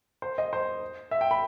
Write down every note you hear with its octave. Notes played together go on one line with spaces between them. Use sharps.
C5
D#5
C5
E5
G5
B5